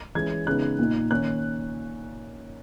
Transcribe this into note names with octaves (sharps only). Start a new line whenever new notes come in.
E3 G#3 C#4 G#6
C#3 G#3 B3 D#4 F#6
A#2 A#3 D#4
D#3 A#3 C#4 F#6